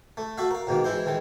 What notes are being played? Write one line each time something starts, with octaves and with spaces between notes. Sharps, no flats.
A3
A3 F#4 E5 F5
A#4 F5
G#2 B2 D#3 A#3
E3 G#3 E4 C5
D#3 E3 G#3